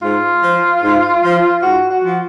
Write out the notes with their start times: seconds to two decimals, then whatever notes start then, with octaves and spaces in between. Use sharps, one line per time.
0.02 G#2 F4
0.42 F3
0.82 G#2
1.23 F3
1.63 G#2 F#4
1.90 F#4
2.04 F3